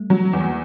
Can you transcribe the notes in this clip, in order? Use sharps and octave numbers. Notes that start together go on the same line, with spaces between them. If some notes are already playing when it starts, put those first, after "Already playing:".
Already playing: G3 A3
F#3
E2
A#3